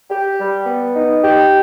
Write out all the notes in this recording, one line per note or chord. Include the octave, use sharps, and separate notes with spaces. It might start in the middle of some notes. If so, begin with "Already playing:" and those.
G4
G3
B3
D#4
G4